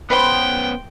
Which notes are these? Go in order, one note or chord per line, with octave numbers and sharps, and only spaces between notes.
B3 C#4 B4 C5 G5 C6